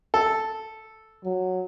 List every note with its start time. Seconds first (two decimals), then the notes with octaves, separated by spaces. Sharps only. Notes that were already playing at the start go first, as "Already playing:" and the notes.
0.14 A4
1.24 F#3